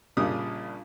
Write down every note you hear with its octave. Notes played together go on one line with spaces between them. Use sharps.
A#1 A#2 C#3 G3 D4 D#6